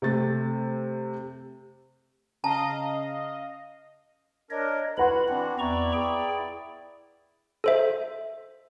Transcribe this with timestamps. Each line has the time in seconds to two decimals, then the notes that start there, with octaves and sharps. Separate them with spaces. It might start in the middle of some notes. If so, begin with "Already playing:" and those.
0.02 C3 A3 A6
2.44 C#3 D#5 F5 A5 A#5
4.51 D4 A#4 C#5 D#5
4.98 E4 F#4 B4 F#5 B5 C6
5.29 E3 C4 D4 F#4
5.59 E2 E4 D5 A#5 C#6
5.93 G#4 G5
7.64 A4 C5 E5